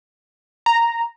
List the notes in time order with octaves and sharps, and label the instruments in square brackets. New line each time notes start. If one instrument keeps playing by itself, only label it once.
[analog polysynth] A#5